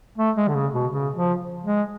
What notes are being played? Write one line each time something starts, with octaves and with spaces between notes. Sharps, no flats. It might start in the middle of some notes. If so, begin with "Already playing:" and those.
A3
G#3
D3
C#3
B2
C#3
F3
G#3